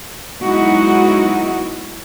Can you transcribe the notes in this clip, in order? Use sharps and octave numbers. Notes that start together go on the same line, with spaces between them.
F#3 G#3 B3 D#4 E4 F#4